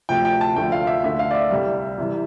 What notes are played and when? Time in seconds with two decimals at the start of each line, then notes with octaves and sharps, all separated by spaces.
0.09 D2 C3 F3 G5
0.25 G5
0.41 A5
0.56 D2 D3 F3 A3 G5
0.72 F5
0.87 E5
1.04 D2 D3 A3 E5
1.19 F5
1.31 D5
1.35 E5
1.51 C2 C3 G3
1.98 C2 C3 E3 G3